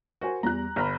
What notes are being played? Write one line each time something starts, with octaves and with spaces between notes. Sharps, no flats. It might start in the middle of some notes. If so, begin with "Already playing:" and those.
F#4 A#4 C5 G#5
E2 G3 A#5 F#6
G1 A#5 B5 F6